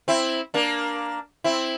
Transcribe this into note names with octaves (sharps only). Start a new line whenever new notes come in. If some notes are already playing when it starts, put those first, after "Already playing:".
C4 E4
A#3 D4
C4 E4